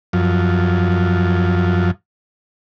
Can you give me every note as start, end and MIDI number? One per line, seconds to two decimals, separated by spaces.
0.13 1.91 42
0.13 1.91 53